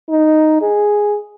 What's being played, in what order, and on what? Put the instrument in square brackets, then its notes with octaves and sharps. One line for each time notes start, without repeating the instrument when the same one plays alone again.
[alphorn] D#4
G#4